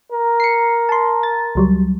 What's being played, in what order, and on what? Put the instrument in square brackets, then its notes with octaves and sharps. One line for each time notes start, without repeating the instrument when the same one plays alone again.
[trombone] A#4
[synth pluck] C7 C#7
A5 C6
A6
C#2 F#3 G3